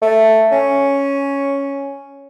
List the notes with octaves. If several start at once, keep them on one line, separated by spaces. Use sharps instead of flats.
A3
C#4